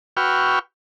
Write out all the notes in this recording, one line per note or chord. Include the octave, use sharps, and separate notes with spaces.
F#4 B4 G5 C#6 E6 F6